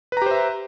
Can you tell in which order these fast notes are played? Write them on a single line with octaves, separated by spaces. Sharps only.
B4 A#5 G4 C5 E5